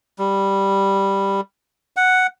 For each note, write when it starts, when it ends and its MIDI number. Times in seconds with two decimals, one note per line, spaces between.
0.18 1.41 55
1.97 2.27 78